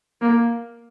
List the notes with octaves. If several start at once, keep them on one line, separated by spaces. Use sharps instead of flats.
A#3